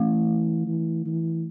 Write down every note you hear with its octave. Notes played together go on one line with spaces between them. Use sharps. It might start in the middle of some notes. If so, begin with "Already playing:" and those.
Already playing: E3 A3
E3
E3